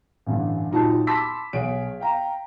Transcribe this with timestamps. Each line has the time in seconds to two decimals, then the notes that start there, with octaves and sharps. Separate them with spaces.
0.26 A1 G2 D3
0.71 A#2 F#3 D#4 G4 A5
1.07 A5 B5 C6 D6 E6 B6
1.53 B1 G#4 C#5 F#5 D7
2.00 F5 G5 A#5